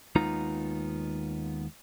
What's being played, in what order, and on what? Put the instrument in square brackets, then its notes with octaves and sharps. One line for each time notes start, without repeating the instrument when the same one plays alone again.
[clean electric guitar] D#2 G#3 B3 D#4 F4 A#5